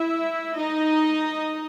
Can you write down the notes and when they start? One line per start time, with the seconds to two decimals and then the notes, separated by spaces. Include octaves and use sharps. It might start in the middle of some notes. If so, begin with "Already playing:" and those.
Already playing: E4 E5
0.56 D#4 D#5